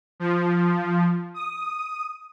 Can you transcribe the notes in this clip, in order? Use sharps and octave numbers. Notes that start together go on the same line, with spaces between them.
F3
D#6